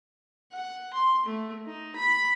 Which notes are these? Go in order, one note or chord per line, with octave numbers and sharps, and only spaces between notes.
F#5
C6
A3
D#4
B5